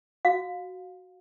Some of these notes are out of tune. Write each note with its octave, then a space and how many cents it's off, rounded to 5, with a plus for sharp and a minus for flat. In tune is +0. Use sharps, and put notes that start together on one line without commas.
F#4 +0 F5 +20